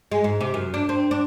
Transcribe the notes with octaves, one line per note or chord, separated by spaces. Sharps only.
G#3
G#2
C3
F#2
D4
C4
D4